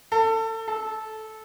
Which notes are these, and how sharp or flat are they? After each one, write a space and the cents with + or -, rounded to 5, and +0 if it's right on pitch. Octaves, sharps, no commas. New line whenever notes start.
A4 +25
A4 -15